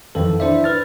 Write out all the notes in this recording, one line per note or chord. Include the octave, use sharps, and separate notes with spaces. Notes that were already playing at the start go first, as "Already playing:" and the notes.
F2 D#3 E3 A4
D4 E4 C5 D5 E5
B4 F6 A6